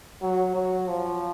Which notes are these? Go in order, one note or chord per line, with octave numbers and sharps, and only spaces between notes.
F#3
F#3
F3